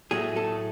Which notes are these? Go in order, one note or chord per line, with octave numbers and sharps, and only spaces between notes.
A2 F#3 A3 G#4
A4